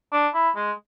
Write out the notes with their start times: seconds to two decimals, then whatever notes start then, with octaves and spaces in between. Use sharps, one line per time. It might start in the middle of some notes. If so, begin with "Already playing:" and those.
0.12 D4
0.34 E4
0.56 G#3